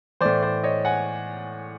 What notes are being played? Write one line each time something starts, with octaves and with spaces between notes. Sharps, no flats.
A2 E3 C5 D5
C5 D5
C#5 D#5
F#5 G#5